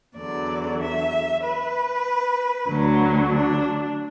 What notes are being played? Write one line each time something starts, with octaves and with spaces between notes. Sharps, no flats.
E2 D3 F#3 D5
E5
B4
D2 D3 F#3
D4